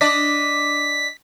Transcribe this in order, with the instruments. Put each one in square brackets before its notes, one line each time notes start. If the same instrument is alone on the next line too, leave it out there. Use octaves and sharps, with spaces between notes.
[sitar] D4 D5 D#5 [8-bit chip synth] B6